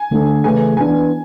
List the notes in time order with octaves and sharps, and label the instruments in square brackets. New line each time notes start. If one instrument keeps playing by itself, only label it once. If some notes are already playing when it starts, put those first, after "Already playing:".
Already playing: [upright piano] G#5
[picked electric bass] D3 A3 D4
[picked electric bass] C#3 E3 A3 [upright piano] G#5
[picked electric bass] E3 B3 D4 [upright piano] G#5